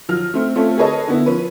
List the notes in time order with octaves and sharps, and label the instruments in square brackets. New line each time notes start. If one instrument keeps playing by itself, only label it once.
[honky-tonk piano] F3 F#3 F6
A3 C4
A3 C4 C#4 F4 A4
G#4 A4 B4 C#5 D#5 A5
D3 B3 E4
F3 C#4 B4